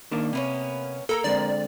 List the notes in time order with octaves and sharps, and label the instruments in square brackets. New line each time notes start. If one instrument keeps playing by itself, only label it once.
[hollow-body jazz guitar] D#3 A#3 D4
[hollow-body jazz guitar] C3 [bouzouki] A#3 B3 C#4
[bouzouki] A#3 A#4 A#5 [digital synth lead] A4
[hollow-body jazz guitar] D3 G#3 C4 [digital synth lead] D5